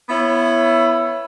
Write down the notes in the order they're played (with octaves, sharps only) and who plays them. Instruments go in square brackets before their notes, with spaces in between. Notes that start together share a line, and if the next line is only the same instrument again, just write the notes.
[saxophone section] B3 C#4 E4